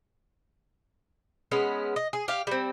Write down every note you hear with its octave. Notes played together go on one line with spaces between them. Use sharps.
G#3 B3 C#4
D#5
G#4
G4 F5
G3 C4